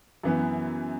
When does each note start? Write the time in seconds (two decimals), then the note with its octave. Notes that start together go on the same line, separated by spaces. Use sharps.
0.24 F#2 E3 B3